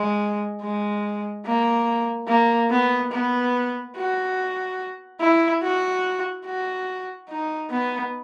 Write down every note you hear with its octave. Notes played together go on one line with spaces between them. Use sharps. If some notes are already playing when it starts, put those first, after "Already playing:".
Already playing: G#3
G#3
A#3
A#3
B3
B3
F#4
E4
F#4
F#4
D#4
B3